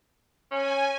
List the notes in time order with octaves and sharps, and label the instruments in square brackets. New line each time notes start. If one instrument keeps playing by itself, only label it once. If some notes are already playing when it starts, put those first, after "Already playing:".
[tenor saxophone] C#4 [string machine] G#5